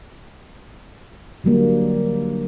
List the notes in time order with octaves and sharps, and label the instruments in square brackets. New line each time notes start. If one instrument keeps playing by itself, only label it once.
[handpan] D3 F#3 G3 A#3